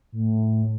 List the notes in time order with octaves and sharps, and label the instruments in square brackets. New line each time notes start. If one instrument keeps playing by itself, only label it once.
[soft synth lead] A2